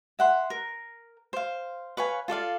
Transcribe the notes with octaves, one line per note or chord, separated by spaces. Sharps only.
E5 F#5 C6
A#4
C5 F5
B4 C#5 F5 G#5
F4 A4 D5 F5